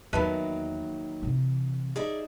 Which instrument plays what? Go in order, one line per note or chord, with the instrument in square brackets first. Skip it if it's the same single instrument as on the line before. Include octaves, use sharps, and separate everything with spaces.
[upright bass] E2 [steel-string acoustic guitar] D#3 F#3 A#3 [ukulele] B4 E5 A5
[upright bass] C3 E3
[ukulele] D#4 [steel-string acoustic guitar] G#4 D5 E5